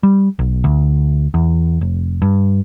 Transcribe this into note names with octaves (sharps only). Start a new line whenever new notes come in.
G3
B1
D2
E2
F1
G2